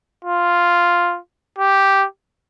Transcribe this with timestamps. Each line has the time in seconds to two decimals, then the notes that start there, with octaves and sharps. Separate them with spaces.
0.25 F4
1.59 G4